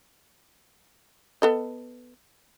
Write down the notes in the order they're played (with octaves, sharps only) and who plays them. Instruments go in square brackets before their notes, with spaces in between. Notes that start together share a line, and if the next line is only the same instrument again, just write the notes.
[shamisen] B3 A4 D#5